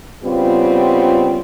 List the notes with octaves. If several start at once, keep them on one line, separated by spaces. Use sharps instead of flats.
C#3 G3 B3 C4 F4